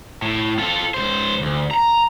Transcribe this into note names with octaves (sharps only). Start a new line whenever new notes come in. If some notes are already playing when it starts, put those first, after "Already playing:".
A2
F4 A4
C#2 C5
D2
A#5